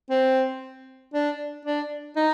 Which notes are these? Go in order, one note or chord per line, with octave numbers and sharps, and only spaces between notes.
C4
D4
D4
D#4